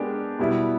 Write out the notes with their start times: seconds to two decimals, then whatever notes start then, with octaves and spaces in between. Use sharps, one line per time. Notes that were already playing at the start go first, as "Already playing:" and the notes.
Already playing: G#3 B3 D4 G4 A#4
0.39 B2 G3 B3 E4